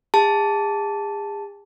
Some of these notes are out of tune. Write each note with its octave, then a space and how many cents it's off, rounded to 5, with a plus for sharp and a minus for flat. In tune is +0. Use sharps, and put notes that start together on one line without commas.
G#4 -40 A5 +0